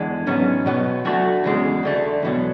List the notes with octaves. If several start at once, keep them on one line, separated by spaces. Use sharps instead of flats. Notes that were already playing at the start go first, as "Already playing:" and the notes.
Already playing: E2 D3 G#3
G#2 F#3 B3 C#4
B2 F#3 B3
D2 D3 A3 F#4
E2 C#3 G#3
D2 D3 A3
E2 B2 F#3